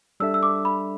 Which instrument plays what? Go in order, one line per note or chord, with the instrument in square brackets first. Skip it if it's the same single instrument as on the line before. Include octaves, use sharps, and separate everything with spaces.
[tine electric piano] G3 D4 A4 E5 [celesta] E6
[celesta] E6
D6
B5